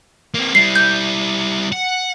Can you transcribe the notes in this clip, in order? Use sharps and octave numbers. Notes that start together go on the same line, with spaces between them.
A#3 C4
G3 E4 C7
G6
F#5